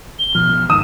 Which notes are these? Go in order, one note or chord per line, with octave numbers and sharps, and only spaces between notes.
G7
A1 B2 F3 F6
E2 G#2 D#3 D#6 E7